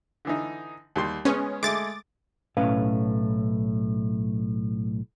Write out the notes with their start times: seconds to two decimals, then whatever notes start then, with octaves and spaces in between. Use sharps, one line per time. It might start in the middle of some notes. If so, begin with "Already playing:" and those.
0.25 D3 E3 D#4
0.96 D#2 G3 C6
1.25 G#3 B3 C#4
1.63 G#3 A3 D6 A6
2.57 B1 A2 C#4 B4 F5